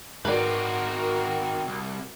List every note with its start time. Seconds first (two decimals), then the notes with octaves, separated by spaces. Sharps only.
0.25 G#2 D#3 C4 F#4 A#4 B4 D5
1.67 C2